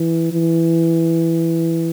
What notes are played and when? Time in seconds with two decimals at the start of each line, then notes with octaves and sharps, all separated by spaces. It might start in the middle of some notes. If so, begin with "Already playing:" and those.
Already playing: E3
0.33 E3